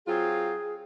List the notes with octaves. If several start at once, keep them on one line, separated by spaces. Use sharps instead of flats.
F#3 C4 F4 G#4